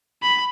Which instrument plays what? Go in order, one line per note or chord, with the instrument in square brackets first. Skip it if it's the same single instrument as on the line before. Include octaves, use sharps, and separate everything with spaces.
[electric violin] B5